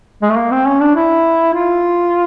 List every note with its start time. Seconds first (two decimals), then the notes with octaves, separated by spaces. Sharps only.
0.22 G#3
0.30 A3
0.36 A#3
0.51 C4
0.66 C#4
0.80 D4
0.96 E4
1.54 F4